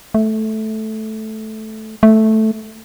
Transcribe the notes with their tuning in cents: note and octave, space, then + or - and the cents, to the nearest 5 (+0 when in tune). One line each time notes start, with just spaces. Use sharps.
A3 -10
A3 -5